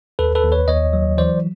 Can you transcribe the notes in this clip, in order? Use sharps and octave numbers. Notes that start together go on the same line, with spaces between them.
D#2 A4 B4
A4 B4
D#2
B4 C#5
D#2 C#5 D#5
F#3
E3 C5 D5